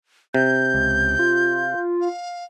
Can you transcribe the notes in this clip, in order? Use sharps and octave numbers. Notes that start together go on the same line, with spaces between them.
C3 G6
C#2
F4
F5